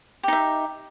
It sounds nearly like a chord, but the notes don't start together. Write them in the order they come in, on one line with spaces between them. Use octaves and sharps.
G4 D#4 E5